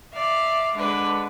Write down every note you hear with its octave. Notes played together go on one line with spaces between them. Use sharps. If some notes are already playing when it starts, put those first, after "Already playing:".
D5 E5 F5
D3 G#3 D4 B4